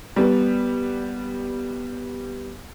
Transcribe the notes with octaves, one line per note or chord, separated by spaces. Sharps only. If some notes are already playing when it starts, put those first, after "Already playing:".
G3 B3